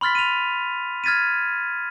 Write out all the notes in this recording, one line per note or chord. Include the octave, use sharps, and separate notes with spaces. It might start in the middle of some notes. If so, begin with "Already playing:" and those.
B5 C6 F6 A6 B6
D#7 F7
F6 G#6 A6 B6 D#7